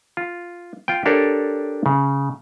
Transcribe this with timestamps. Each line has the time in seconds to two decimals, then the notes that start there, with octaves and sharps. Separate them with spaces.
0.17 F4
0.88 F4 G5
1.06 D4 G4 A4 A#4 C#5 D5
1.86 C#3